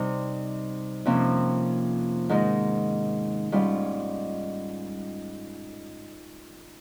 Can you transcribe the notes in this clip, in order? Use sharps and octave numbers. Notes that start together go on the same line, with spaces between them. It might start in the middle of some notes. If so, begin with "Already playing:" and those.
Already playing: C3 G3 C4 D#4
F2 C3 F3 A#3 C#4
G#2 D#3 G#3
G#2 G3 C#4 F4